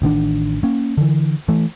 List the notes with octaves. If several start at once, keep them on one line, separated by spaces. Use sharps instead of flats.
A1 D#3 C#4 D4
A#3 C#4
D3 E3
E3 A3